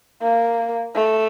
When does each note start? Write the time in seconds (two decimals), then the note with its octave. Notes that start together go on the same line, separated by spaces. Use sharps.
0.22 A#3
0.95 A3